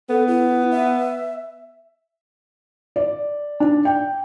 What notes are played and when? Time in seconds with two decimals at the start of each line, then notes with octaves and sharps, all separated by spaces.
0.09 B3 A4
0.27 E4
0.72 E5
2.96 D5
3.60 D4
3.85 G5